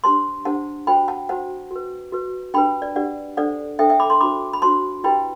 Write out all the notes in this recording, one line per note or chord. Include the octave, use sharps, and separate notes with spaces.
D4 G4 C5 A5 C6
D4 G4 C5 F#5 A5
F#4 C5 G5 B5
F#5 A5
F#4 C5 F#5 A5
F#4 B4
F#4 B4
D4 G4 B4 G5 B5
D5
D4 G4 B4 D5 F#5
D4 A4 C5 D5 F#5
D4 A4 C5 E5 G5
E5 G5
B5 D6
A5 C6
D4 F#4 C5 B5 D6
B5
D4 F#4 C5 A5 C6
E4 G4 B4 G5 B5